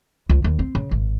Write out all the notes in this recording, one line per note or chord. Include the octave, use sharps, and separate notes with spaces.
C#2
D#2
C4
C#3
G#1